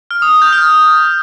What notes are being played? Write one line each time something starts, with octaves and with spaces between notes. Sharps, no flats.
F6
D#6
G6
F6